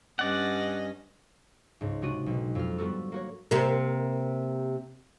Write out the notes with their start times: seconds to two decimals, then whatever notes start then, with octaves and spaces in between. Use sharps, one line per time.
0.19 G2 C#4 D5 D#5 F#5
1.81 C#2 G#2
2.01 C3 G#3 D4 F#4 D#7
2.26 B1 B2
2.55 F2 F6
2.78 G3 B3 F#4 A4
3.12 A#3 F#4 C#5
3.51 C3 A#3